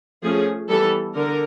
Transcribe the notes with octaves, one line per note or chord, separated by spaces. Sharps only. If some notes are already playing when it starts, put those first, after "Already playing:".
F3 A3 C#4 G#4
E3 G3 B3 A4
D3 A#4